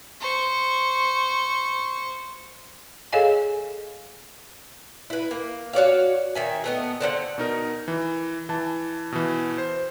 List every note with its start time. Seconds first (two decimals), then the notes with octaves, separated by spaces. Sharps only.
0.20 C5 C#6
3.12 G#4 A4 C#5 D#5 F5 G#5
5.10 E4 B4
5.31 A#3
5.73 F#4 C#5 D5 F5
6.35 D#3 E5 G#5
6.64 A3 B3 D#5
7.01 D3 C4 D4 F#5
7.38 B2 D#4 A#4
7.88 E3
8.49 E3 A5
9.12 B2 E3
9.58 C5